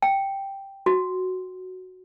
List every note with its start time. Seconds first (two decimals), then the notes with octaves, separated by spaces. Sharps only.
0.02 G5
0.86 F#4